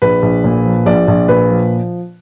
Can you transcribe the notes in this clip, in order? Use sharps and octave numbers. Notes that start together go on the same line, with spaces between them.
A#1 B4
A#1
A#2
F3
A#1 D5
A#1
A#2 B4
F3